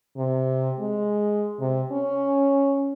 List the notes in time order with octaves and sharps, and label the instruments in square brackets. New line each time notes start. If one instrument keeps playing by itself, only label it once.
[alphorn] C3
G#3
C3
C#4